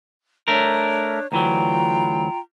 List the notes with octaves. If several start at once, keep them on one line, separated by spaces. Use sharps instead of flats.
A3 D4 A#4 C#5
D2 E3 F#3 F4 G5 A#5